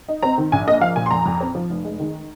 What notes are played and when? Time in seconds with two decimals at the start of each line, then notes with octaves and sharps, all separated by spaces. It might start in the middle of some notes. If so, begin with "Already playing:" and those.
0.08 D#4
0.23 C4 A#5
0.38 D#3
0.52 A#1 G#5
0.67 A#3 D#5
0.81 F3 F5
0.96 A#2 G#5
1.06 C6
1.11 F2 A#5
1.26 F2
1.40 C4
1.55 F3
1.70 F1
1.84 G#3
2.00 D#3